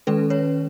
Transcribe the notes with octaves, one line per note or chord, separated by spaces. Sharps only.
D#3 G#3 C#4 A4 B4
B4 C#5